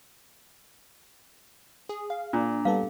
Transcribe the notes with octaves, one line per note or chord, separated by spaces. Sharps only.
G#4
F5
A#2 D4 A#5
G3 B3 A4 F5